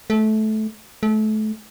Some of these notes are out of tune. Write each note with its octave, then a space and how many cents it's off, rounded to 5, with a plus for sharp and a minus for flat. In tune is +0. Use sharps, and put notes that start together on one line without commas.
A3 -20
A3 -30